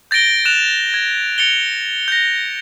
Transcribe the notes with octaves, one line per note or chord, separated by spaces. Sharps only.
G6 A6 A#6 D7 G7
F#6 E7 F7
G#6 E7
A6 C#7 F7 G7
G6 A#6